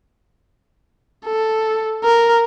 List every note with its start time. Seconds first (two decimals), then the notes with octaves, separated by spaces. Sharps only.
1.26 A4
2.04 A#4